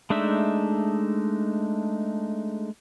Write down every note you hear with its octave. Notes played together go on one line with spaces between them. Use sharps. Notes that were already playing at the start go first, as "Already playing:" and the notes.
G#3 A3 D4 D#4 E5